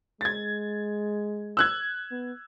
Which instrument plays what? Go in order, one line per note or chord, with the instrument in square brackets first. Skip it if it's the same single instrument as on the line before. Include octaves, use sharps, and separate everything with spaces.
[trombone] G#3 [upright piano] G#6 A6
[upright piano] E6 F#6 G#6
[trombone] B3